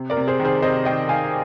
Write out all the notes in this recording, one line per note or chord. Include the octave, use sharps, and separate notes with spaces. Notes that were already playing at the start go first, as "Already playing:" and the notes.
Already playing: C3
A#4 D5
C3
G#4 C5
D#3
G#4 C5
C3 C5 D#5
D#3 D#5 G5
D#3 F5 G#5